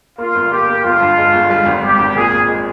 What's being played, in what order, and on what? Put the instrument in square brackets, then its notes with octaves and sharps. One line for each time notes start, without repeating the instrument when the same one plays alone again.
[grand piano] A#3 [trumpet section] F4
[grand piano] G1
[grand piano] A#3 [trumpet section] G4
[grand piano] A#3
[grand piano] G1 [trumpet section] F4
[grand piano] G2
G#3
G1
G3
G#1
[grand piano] G3 [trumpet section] G4
[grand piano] G#1
[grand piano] A#2 [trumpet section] G#4
[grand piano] A#2
G#3